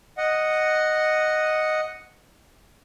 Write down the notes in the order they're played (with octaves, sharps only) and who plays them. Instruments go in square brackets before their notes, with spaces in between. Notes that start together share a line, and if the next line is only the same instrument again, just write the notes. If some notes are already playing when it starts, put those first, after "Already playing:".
[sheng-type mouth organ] D#5 F#5